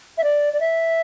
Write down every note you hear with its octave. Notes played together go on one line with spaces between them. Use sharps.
E5
D5
D5
E5